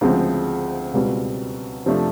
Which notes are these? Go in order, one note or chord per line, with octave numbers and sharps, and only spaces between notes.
D2 C#3 F3 G#3 C4
C#2 B2 G3 C4
F2 C3 F3 A3 D4